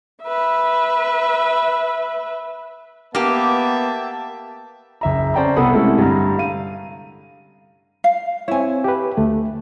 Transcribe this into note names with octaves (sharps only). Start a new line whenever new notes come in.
B4 E5
A#3 B3 G4 E5 G5 A5
F#1 E5 A#5
C#4 C5 D5 G5 A5 A#5
C2 B3 A4 F#5 B5 D#6
C3 G#3 A3 C#4 E4 A4
G2 D3 A#5
F5 D#7
F5
C4 E4 C#5 G#5
G4 B4
D2 A3